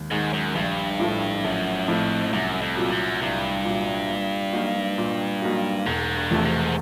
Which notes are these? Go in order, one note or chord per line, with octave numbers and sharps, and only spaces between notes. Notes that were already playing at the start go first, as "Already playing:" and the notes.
Already playing: D#2 G#3
G#2 D#3 G#3
F#2
A#1 G2
A2 F3 A3
A#1 F#2
F2 A2 F3 A3
C2 F#2
F2
A#2 F#3
F#2
C2 G2
A#2 F#3
A#2
F#3 A#3 D#4 F#4
A#2
F#3 A#3 D#4 F#4
E1 G#2
G2
E2 C3 F3 A3
G#2